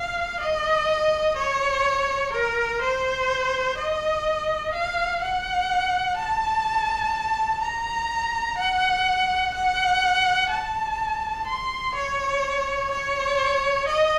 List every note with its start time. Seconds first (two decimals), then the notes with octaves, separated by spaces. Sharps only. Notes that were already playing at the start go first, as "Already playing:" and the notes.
Already playing: F5
0.40 D#5
1.37 C#5
2.32 A#4
2.81 C5
3.77 D#5
4.73 F5
5.21 F#5
6.17 A5
7.61 A#5
8.58 F#5
9.54 F#5
10.50 A5
11.47 C6
11.95 C#5
12.91 C#5
13.87 D#5